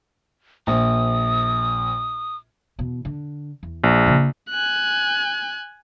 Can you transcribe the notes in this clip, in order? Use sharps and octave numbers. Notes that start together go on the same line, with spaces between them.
A#1 D#6
E2 B2
D3
E2
A#1
C#3 A#3
G#5 F#6